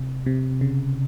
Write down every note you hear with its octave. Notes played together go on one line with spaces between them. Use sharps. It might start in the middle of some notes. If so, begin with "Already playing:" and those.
Already playing: C3
C3
C#3